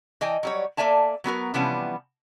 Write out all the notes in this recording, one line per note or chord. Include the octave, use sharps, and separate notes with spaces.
E3 D#5 G5 G#5
F#3 G3 C#5
A#3 A4 D5 E5 G#5 A5
F#3 B3 F#4 A#4
C3 E3 F3 G3 B3 C#4